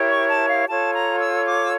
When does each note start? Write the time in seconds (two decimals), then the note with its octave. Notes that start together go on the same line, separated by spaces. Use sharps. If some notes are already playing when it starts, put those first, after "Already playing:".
Already playing: E4 G4 A#4 C#5
0.09 C#6
0.29 A5
0.48 F5
0.68 F4 A4 C#5 A5
0.94 A#5
1.20 E6
1.46 D6
1.63 E6